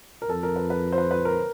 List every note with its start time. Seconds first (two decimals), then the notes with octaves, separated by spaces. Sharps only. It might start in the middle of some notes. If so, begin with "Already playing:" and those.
0.22 A#4
0.29 F2 A4
0.43 A#4
0.56 B4
0.70 B4
0.92 C5
0.98 B4
1.11 B4
1.25 A#4